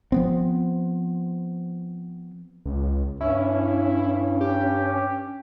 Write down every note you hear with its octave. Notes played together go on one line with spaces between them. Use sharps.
F3 B3 C4
C#2
G2 C#4 E4
G4